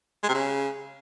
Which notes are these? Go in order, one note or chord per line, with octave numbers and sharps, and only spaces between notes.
G#3
C3
C#3